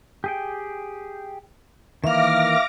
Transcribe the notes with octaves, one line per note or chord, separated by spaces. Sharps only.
G4 G#4 G5
D#3 E3 A#3 E5 F5 D6 F6 A#6